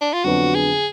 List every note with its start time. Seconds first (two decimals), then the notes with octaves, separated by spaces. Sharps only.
0.01 D4
0.13 F4
0.24 F2 D3 F#3 B3 D4 F#4
0.55 G#4